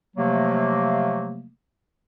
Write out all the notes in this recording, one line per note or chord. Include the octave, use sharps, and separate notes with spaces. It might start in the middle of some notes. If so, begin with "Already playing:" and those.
C3 F3 F#3 A3 A#3